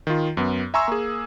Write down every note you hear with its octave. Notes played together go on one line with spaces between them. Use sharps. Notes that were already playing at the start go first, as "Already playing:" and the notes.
D#3 F4
F#2 B3
E5 G#5 A#5 C6 C#6 E6
A#3 G#4